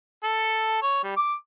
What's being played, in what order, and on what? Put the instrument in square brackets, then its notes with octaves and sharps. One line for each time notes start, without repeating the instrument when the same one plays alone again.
[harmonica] A4
C#5
G3
D6